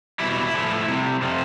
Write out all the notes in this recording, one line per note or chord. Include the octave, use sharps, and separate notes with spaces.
B2 G3 E4
A2 F3 A3
C3 G3
C3 F3 A3